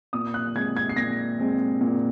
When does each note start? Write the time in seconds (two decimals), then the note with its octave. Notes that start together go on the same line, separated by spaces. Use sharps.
0.13 A#2 D#6
0.34 F#6
0.55 G#3 C4 G#6
0.77 G#6
0.89 C7
0.96 A#2 A#6
1.40 G#3 C4
1.81 A#2